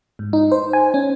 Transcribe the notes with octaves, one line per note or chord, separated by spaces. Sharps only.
G#2
D#4
C5
G#5
C#4